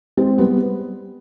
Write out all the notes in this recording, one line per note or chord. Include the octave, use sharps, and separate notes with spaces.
G#3 C4
G3 B3